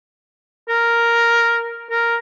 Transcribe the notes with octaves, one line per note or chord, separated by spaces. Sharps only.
A#4
A#4